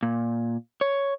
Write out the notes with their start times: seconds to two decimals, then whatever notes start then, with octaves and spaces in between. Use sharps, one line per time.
0.03 A#2
0.81 C#5